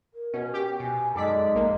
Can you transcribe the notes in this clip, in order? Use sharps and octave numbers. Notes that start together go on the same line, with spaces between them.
A#4
B2 C#4
G4 G5
B2 G#5
F#2 G#3 D#4 A4 D5 B6
A#1 A#3